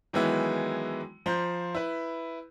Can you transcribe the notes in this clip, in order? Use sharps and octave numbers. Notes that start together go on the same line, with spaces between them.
D#3 E3 F#3 G#3 B3 E4
F3 C5 A#5 G6
E4 B4